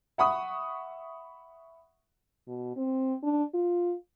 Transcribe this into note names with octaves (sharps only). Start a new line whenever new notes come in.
E5 F#5 B5 C#6 D#6
B2
C4
D4
F4